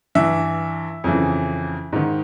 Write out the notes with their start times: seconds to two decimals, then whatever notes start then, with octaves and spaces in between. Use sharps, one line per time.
0.15 G2 E3 E5
1.04 F2 C#3 E3
1.92 G#2 D#3